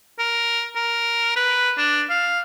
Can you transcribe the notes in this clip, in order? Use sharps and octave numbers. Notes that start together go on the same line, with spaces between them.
A#4
A#4
B4
D4
F5